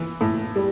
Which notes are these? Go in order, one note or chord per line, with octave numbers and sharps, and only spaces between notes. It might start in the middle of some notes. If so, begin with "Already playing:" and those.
Already playing: E3
A2
G3